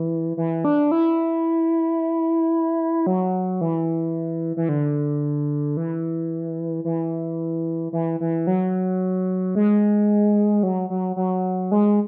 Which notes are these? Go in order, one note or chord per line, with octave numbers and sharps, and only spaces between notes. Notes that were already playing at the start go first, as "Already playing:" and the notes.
Already playing: E3
E3
D4
E4
F#3
E3
E3
D3
E3
E3
E3
E3
F#3
G#3
F#3
F#3
F#3
G#3